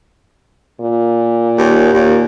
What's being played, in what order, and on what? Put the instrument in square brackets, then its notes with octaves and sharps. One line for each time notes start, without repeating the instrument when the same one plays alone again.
[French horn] A#2
[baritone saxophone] D#2
[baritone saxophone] D#2 [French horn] A#2